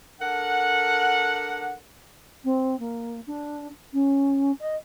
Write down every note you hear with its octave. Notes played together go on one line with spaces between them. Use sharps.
D4 A4 A#4 F#5
C4
A#3
D4
C#4
D#5